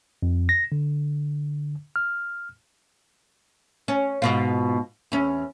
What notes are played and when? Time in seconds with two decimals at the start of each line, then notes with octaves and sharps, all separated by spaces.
0.23 F2
0.49 A#6
0.72 D3
1.96 F6
3.88 C#4
4.22 G#2 B2 F4
5.12 E2 C#4